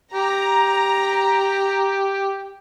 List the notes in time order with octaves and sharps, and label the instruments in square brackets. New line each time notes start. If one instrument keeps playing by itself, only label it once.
[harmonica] G4 [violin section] A#5